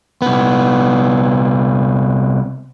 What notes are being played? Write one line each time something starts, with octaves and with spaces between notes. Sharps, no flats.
C2 B3